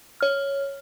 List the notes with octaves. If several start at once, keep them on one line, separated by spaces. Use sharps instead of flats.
C#5 F6